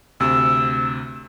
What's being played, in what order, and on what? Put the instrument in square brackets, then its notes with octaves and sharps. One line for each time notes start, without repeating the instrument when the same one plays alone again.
[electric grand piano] D2 C3 [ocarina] E6